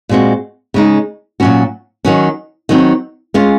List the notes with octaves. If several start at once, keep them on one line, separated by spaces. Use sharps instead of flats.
A#2 G#3 C4 F#4
C#3 G#3 D#4
A#2 F#3 C#4 F#4
D#3 F#3 C#4
D#3 F#3 C4
G#3 C#4 F4